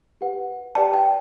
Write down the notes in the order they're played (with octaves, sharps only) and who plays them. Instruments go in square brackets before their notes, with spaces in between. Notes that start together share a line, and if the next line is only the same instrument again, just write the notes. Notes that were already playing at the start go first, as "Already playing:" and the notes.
[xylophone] G4 B4 F#5
G4 B4 D5 G5 A5
G5